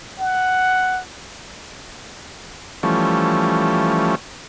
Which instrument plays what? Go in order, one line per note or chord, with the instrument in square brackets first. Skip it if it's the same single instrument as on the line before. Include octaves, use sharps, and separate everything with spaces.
[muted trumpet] F#5
[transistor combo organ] E3 F3 G3 A3 C#4